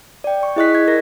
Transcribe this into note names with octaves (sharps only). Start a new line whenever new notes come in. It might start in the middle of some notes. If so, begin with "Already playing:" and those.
D5 G5
C#6
E4 G#4 D#5 C#6 F#6 B6
G#6
A#4 A#6